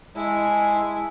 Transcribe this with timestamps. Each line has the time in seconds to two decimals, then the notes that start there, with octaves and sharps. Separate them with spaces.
0.16 G#3 E4 G#5 A5